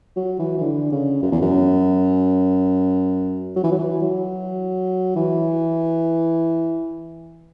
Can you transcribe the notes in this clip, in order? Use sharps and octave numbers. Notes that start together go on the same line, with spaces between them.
F#3
E3
E3
D3
C#3
F#2
E2
F#2
F#3
E3
F#3
E3
F#3
E3